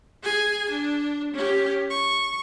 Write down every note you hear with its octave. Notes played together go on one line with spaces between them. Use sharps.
G#4 G#5
D4
C#4 G4
C#6